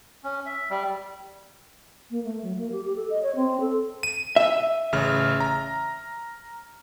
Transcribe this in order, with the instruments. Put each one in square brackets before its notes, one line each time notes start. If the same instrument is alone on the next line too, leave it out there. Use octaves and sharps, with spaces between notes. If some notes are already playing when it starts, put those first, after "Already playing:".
[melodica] C#4
E5
G3
[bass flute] A#3
A3
F#3
A#3
G4
G4
A4
D#5
C#5
C4
A4
[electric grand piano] D#7
[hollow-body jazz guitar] E5
[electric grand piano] A1 C#3 F6
A#5